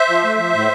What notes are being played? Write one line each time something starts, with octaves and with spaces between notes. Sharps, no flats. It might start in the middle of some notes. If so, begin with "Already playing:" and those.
Already playing: C5 E5
F3
A3
F3
A2